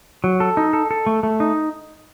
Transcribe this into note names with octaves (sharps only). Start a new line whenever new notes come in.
F#3
A4
D#4
A4
A4
A3
A3
D#4